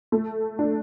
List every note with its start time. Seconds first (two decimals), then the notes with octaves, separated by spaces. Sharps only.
0.12 A3
0.59 D4